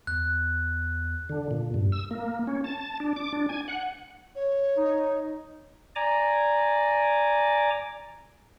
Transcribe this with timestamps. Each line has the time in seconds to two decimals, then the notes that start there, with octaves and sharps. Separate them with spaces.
0.07 E2 F#6
1.29 D3
1.51 A#2
1.74 G2
1.92 E6
2.11 A#3
2.47 C#4
2.64 A5
3.00 D4
3.16 D6
3.33 D4
3.49 G#5
3.68 F#5
4.35 C#5
4.76 D#4
5.96 D5 G#5 A#5 D6